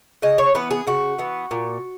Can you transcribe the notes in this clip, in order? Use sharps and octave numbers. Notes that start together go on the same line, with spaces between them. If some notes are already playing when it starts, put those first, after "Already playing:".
C#3 D#5
C#5
E3 B3 B4
G#4
C#3 F#4
E3 B3
A#2